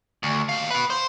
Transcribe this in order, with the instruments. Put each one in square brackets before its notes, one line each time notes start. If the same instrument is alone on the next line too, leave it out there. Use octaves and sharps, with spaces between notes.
[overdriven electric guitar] D2
D#2 F5
F#4 B4
C5